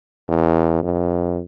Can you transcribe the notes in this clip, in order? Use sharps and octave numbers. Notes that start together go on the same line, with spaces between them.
E2
F2